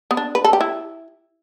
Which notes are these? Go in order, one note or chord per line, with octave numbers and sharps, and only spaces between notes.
B3
D4
B4
A4
G4
E4